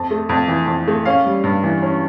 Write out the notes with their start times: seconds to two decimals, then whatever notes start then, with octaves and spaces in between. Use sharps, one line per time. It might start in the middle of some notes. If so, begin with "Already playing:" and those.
Already playing: F2 A5
0.11 A3
0.29 F2
0.48 E3
0.67 F2
0.88 A3
1.05 C#4 F5
1.25 G3
1.44 G2
1.64 E3
1.82 C#4